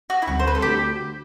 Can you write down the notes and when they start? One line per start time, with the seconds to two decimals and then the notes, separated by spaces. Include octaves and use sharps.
0.10 F#4
0.22 E4
0.27 D2 D3 G3 C4 F#4
0.39 C5
0.47 B4
0.55 A4
0.62 D3 A3 D4 F#4 G4